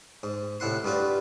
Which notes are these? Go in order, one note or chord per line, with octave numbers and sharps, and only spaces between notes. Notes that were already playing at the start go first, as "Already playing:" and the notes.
G#2
C2 A2 E4 F#5 C6
G2 G3 F4 F#4 B4